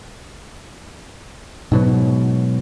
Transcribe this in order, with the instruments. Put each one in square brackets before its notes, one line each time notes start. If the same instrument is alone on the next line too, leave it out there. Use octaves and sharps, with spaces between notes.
[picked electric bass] G#2 B2 F#3